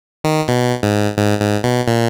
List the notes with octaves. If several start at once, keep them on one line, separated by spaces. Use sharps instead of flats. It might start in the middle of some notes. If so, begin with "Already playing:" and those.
D#3
B2
G#2
G#2
G#2
B2
A#2